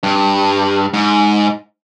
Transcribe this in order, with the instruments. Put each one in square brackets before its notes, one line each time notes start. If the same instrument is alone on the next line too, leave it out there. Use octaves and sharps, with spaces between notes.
[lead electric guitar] G2
G#2